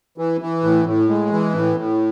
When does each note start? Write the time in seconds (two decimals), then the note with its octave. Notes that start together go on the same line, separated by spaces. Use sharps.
0.18 E3
0.41 E3
0.63 A2
0.86 A2
1.09 G#3
1.32 E3
1.54 A2
1.77 A2